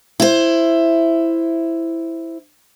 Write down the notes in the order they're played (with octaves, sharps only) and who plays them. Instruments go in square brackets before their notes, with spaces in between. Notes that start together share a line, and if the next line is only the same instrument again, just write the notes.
[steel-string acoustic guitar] E4 C5